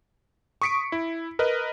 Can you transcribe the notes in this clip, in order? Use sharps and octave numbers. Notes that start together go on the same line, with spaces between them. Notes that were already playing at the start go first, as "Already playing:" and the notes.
C#6 D#6 B6 C#7 D7
E4
A#4 B4 D#5